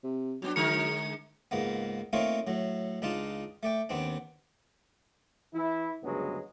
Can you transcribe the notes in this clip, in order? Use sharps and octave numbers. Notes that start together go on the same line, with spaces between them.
C3
G#2 F#3 B3 D4
D3 G#3 A#4 C#7
C#2 G#2 A#3 B3
A3 A#3 C4 D#4 F4 C#5
A2 F#3
C#2 D4 D#4 F4 A5
A3 D5 G5
D#2 B3 C4 D4
E3 E4
D2 G2 C#3 F#3 G#3 B3